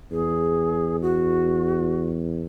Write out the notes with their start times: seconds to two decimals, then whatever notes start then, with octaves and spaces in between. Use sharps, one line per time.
0.12 E2 G#4
1.02 F#4